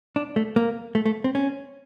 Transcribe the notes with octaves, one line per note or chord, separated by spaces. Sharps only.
D4
A3
A#3
A3
A3
C4
C#4